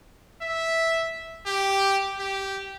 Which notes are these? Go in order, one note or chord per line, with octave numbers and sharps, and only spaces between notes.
E5
G4
G4